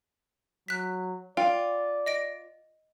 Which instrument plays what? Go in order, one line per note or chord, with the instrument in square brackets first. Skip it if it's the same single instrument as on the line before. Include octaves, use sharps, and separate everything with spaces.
[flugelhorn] F#3 [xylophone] F#6 B6
[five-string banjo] F4 [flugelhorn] D5 [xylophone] G5
[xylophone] D#5 A#6 D7